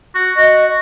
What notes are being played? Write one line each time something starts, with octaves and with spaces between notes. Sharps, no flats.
F#4
F#4 D#5